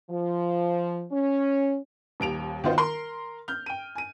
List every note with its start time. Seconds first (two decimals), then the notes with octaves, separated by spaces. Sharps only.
0.10 F3
1.12 C#4
2.20 D#1 D#2 D7 F7
2.64 D#3 B3 D#4 F4 F#4 C5
2.78 A#4 C6
3.48 F6 G6
3.66 G5 D#7
3.95 G#5 D#7